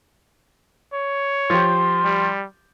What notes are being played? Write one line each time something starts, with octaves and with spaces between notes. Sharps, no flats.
C#5
F3 G4 C6
G3